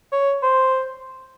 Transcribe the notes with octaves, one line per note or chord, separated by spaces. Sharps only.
C#5
C5